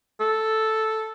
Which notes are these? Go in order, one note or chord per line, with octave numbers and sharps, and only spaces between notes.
A4